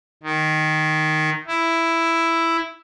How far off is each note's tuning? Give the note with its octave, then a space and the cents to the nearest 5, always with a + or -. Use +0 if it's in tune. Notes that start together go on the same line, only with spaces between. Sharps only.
D#3 -5
E4 +5